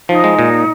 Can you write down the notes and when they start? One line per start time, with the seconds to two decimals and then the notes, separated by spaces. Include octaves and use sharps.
0.09 F3 D#4
0.24 G#3
0.39 A#2